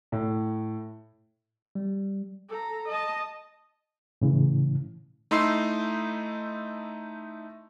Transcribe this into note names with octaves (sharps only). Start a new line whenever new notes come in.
A2
G3
A4 A#5
D#5 A5
A2 C#3 E3
A3 D#4 E4 C6 E6 C7